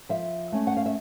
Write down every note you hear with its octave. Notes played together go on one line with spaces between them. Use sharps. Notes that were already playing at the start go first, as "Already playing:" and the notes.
F3 E5
A3 C#4
F#5
F5
E5